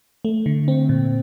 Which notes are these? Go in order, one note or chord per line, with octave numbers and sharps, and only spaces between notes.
A3
D3
C4
A#2